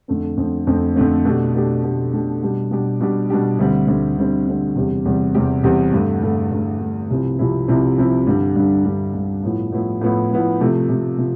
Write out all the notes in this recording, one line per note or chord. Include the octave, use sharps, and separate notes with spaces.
F2 D3 A3 C4
F2 D3 A3 C4
F2 D3 A3 C4
F2 D3 A3 C4
B2 A3 D4 G4
B2 A3 D4 G4
B2 A3 D4 G4
B2 A3 D4 G4
B2 G3 D4 G4
B2 G3 D4 G4
B2 G3 D4 G4
B2 G3 D4 G4
D2 D3 G3 C4
D2 D3 G3 C4
D2 D3 G3 C4
D2 D3 G3 C4
E2 C3 G3 C4 G4
E2 C3 G3 C4 G4
E2 C3 G3 C4 G4
E2 C3 G3 C4 G4
G2 D3 A3
G2 D3 A3
G2 D3 A3
G2 D3 A3
C2 C3 F3 C4 E4
C2 C3 F3 C4 E4
C2 C3 F3 C4 E4
C2 C3 F3 C4 E4
G2 D3 G3
G2 D3 G3
G2 D3 G3
G2 D3 G3
A2 F3 B3 E4
A2 F3 B3 E4
A2 F3 B3 E4
A2 F3 B3 E4
C3 F3 A3
C3 F3 A3
C3 F3